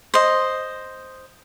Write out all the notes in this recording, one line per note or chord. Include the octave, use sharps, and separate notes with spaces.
C5 D#5